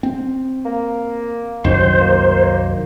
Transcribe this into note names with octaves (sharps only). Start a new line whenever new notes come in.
C4
A#3
C2 F#2 D#3 C5
A#3